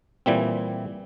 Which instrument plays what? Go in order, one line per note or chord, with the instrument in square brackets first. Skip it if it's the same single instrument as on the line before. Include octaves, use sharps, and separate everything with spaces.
[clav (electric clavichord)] A#2 E3 G3 C4